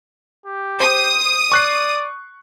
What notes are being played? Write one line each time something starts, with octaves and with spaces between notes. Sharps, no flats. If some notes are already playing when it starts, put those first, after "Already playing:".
G4
C5 D#6
D5 C#6 F#6 C7